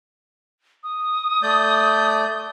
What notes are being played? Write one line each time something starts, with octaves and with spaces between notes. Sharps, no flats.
D#6
A3 D5 G6